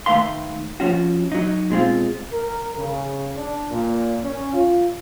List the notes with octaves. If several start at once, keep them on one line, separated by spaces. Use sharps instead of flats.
D#3 A3 B4 E5 F5 C6
F3 C#4 F#4
F#3 D#4
B2 G#3 C4 F4
A#4
C#3
D4
A#2
C#4
F4